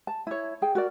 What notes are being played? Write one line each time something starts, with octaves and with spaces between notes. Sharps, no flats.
A5
E4 C#5
G#4 G5
F#4 A#4 D5